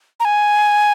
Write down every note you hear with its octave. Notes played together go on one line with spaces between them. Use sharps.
A#5
G#5